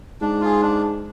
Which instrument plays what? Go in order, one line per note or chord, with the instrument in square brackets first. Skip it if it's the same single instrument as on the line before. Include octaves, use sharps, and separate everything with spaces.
[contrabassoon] G#2 [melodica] D4
[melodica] F4 G#4
D4